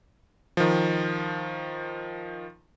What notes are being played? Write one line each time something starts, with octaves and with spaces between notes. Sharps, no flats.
D#3 F3